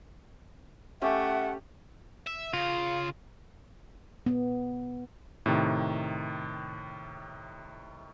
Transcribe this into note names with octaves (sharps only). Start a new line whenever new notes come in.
A3 C#4 G4 C#5 E5 F#5
E5
C#3 F4
B3
A2 C3 D#3